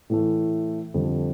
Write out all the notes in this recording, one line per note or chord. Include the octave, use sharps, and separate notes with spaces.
A2 E3 A3
F2 D3 G3